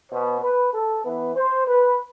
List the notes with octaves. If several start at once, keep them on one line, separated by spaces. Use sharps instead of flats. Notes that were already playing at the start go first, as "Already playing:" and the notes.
B2 B3 C5
B4
A4
E3 B3 B4
C5
B4